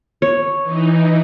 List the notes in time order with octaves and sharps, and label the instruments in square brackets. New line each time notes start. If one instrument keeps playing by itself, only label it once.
[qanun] C#5
[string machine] E3 D#4